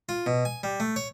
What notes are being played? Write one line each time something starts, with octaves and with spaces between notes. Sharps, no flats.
F4
B2
G#5
G3
A3
C#5